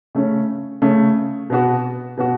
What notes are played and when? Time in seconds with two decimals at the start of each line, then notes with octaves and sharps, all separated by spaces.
0.15 C#3 A3 C#4
0.82 C#3 A3 C#4
1.50 B2 B3 F#4
2.17 B2 B3 F#4